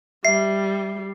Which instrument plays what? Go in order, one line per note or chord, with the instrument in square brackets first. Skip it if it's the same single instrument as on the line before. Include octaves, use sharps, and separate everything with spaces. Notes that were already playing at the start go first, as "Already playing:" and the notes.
[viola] G3 [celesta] E5 [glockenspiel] C7